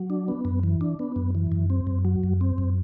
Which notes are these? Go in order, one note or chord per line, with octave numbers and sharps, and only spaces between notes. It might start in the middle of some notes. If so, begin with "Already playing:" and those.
Already playing: F#3
D4
B3
F#2
E3
D4
B3
F#2
E3
F#2
C4
F#2
F#3
F#2
C4
F#2